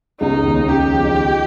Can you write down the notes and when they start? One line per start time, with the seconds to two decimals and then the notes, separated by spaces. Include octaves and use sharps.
0.20 C#2 C#3 D#4
0.45 D#2 D#3
0.68 C#3 C#4 G4
0.92 F3 F4
1.04 D#3 D#4